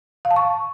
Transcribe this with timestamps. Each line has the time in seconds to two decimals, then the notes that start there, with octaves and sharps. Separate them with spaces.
0.25 F5
0.31 A5
0.36 C#6